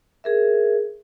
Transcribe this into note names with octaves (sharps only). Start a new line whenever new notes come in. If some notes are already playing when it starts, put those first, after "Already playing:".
G#4 A#4 E5